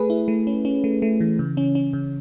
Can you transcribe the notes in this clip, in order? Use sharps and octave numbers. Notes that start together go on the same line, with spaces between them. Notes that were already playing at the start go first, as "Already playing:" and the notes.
Already playing: A3 G#4 B4
E4
A3
C#4
C#4
A3
A3
E3
C#3
C#4
C#4
C#3